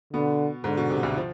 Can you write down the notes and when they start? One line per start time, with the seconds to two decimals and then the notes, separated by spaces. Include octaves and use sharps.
0.13 B2 D3 B3
0.64 G#2 D3 G#3
0.77 B2
0.90 C3
1.03 D2 D3
1.16 F3